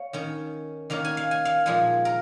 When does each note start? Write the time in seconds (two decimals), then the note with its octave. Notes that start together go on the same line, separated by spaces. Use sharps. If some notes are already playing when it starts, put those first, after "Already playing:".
Already playing: C#5 F5
0.13 D#3 C#4
0.90 D#3 A#3 C#4 F5
1.05 G#5
1.17 F5
1.31 G#5
1.45 F5
1.66 A#2 F3 G#3 G#5
2.05 A#4